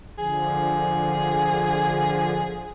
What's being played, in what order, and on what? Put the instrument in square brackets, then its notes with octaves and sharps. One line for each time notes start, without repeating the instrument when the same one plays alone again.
[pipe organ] D3 F3 [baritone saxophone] G#4